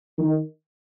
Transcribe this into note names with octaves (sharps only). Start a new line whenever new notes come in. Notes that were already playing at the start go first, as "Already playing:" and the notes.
D#3